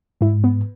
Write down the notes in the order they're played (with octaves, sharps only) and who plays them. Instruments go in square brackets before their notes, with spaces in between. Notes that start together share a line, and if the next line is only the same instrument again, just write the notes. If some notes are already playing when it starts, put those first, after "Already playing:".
[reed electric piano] G#2 [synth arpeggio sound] E4
[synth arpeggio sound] B3